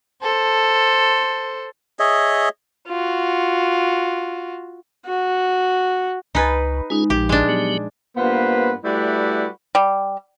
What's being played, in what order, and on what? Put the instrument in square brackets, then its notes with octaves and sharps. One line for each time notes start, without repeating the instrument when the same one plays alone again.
[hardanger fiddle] A4 C5
[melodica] G#4 C#5 D#5 E5
[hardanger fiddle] F4 F#4
[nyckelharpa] F#4
[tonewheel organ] C#2 [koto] D#4 B4 [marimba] G#5 G#6 A6
[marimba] G#3 D#4 [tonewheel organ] C#4 F4 G#4
[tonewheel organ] A#1 [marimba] A#2 F3 [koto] G4
[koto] G#3 D4
[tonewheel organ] F#3 B3 G4
[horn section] G2 A#3 B3 F4 B4 C5
G3 A3 E4 F#4 B4 D5
[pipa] G3